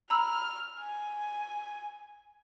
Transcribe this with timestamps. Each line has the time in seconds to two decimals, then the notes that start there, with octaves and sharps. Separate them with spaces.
0.10 A#5 B5 E6 F6
0.79 G#5